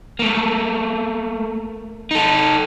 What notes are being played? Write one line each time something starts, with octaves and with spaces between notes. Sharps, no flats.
A3 A#3
D#4 A4